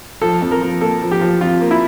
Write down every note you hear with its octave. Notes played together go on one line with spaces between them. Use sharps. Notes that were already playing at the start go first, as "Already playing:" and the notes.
F3 A4
F2
A#4
F3
A#3 A4
F3
G4
F3
F2 F4
A#3
E4